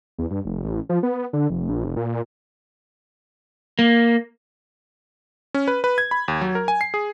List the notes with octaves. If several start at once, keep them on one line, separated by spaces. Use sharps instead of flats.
E2
G2
F1
A1
F3
B3
D3
F1
A#1
F1
A#2
A#3
C#4
B4
B4
G#6
B5
D#2
F#3
A#4
G#5
C7
G#4